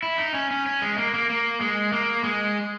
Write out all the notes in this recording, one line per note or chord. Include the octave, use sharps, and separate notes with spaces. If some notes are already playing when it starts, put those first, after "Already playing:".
E4
D#4
C#4
C#4
C#4
G#3
A#3
A#3
A#3
G#3
A#3
G#3